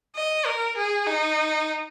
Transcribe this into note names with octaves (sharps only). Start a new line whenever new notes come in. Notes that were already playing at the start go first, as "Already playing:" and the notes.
D#5
A#4
G#4
D#4